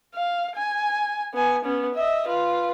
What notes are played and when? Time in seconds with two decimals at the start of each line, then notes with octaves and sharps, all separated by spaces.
0.15 F5
0.56 G#5
1.34 B3 G#5
1.64 B3 C#4
1.95 D#5 E5
2.28 F4 B4